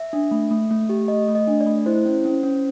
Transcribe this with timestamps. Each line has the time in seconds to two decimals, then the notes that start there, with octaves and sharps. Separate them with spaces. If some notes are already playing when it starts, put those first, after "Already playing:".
Already playing: E5
0.13 D4
0.31 A3
0.51 A3
0.71 A3
0.89 G4
1.08 A3 D#5
1.28 A3
1.35 D#5
1.48 D4
1.61 D5
1.66 A3
1.86 E4 C5
2.05 C#4
2.25 C#4
2.43 C#4